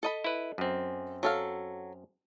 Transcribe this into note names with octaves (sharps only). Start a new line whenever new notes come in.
A4 D#5 B5
E4 B4
F#2 C4
F#3 A4 F5